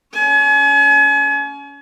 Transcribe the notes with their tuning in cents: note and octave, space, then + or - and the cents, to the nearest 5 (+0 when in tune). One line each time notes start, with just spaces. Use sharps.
C#4 +25 G#5 +40